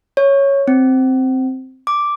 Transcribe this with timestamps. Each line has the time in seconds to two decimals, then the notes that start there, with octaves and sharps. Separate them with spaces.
0.17 C#5
0.68 C4
1.87 D6